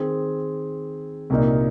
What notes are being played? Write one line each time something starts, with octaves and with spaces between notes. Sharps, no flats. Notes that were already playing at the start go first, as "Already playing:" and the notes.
Already playing: D#3 C4 G#4 C5
C2 A#2 A#3 D#4